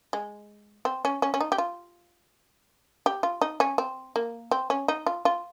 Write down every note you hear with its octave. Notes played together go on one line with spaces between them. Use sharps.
G#3
C4
C#4
C#4
C#4
D#4
G4
F4
G4
F4
D#4
C#4
C4
A#3
C4
C#4
D#4
F4
F4